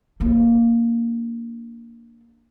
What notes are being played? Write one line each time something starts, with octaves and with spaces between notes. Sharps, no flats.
A#3 D4